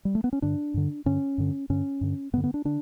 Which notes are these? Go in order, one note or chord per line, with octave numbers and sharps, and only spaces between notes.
G3
A3
B3
C#4
G2 D3 D4
G2 D3
G2 D3 C#4
G2 D3
G2 D3 C#4
G2 D3
G2 D3 B3
B3
D4
D3 D4